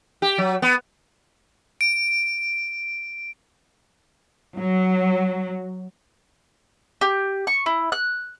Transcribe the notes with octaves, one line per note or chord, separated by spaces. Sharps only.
G4
F#3
B3
D7
F#3
G4
C#6
E4
F#6